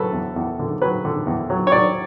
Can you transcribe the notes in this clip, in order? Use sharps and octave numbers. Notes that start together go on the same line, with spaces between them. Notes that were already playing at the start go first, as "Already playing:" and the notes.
Already playing: D3 F#3 A4 B4
E2
E2
D3
F#3 B4
D3
E2
F#3
C#5
F#3 D5